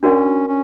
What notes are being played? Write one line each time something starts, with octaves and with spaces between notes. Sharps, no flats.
C#4 D4 F#4 A#4 D5 F#5
C#4